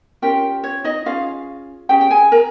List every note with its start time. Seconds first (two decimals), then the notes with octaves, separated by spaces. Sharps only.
0.22 C#4 F4 G4 A#4 G5
0.64 C#5
0.84 D#4 D#5
1.05 C#4 F4 G#4 F5
1.89 C#4 G4 G#4 G5
2.01 G5
2.11 G#4 G#5
2.32 A#4 A#5